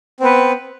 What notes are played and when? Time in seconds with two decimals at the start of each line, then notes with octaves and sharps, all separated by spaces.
0.20 C4
0.23 B3
0.25 B4